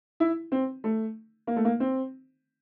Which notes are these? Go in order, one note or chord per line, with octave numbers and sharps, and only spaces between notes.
E4
C4
A3
A#3
A3
A#3
C4